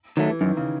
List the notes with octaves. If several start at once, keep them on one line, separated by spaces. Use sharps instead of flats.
D#3 F#3 A3
E3
F#2 D#3
C#3